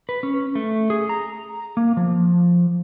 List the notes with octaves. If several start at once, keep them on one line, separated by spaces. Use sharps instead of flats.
B4
C#4
A3
G#4
A#5
A#3
F3